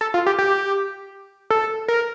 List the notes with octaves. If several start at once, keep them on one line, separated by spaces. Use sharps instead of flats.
A4
F4
G4
G4
A4
A#4